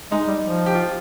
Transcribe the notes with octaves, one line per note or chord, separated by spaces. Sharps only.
G#3 D#4
G3
F3
G4
F4